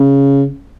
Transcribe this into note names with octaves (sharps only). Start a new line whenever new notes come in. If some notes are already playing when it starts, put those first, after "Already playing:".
Already playing: C#3